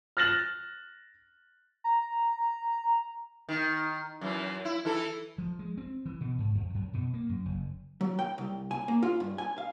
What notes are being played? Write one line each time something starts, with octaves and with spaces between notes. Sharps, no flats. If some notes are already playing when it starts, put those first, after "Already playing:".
F6 F#6 A6 A#6 E7 F#7
A#5
D#3
F#2 E3
E4
E3 E4 A4
F3
G#3
C4
E3
B2
G#2
F2
F#2
B2
A#3
F#2
F#1
F#3
G5
C2
G#5
A#3
F4
G2
G#5
F5